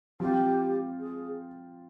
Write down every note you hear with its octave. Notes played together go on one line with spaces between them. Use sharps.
F3 C4 F4 G4
G#4